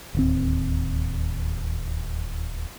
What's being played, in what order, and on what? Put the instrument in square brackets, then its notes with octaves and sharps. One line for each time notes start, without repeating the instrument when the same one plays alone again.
[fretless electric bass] D1 D#2 C4